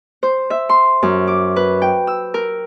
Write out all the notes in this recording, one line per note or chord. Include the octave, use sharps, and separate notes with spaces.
C5
E5
C6
F#2
D6
B4
G5
E6
A#4